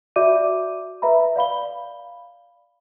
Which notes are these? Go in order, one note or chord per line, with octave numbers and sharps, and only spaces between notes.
F#4 D5 E5 D6 D#7
B4 E5 A#5 B5
D5 F5 B5 G7